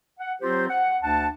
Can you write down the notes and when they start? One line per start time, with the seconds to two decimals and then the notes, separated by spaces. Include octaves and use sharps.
0.19 F#5
0.41 F#3 C4 F4 G4 C5
0.69 F#5
1.02 D2 D4 F#5 A5